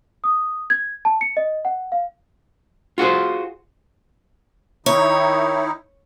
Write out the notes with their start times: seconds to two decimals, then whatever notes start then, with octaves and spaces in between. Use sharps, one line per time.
0.24 D#6
0.70 G#6
1.05 A5
1.21 C#7
1.37 D#5
1.65 F#5
1.92 F5
2.98 F4 F#4 G#4 C5
4.86 D#3 D#4 E4 C#5